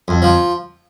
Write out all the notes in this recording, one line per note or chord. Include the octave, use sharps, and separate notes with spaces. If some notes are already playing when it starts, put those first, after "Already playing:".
F2
F3